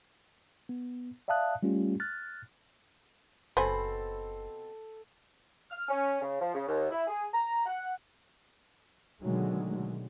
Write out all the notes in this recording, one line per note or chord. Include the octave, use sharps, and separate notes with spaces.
B3
D5 E5 F5 A5 D#6 F#6
G3 A3 C#4 F4 G4
F6 F#6 A6
F#1 B2 C4 A4 C5 G#5 B5
F6
C#4
C#3
F3
C#3
D#2
E4
G#4
A#5
F#5
B2 D3 D#3 F#3 G#3 A3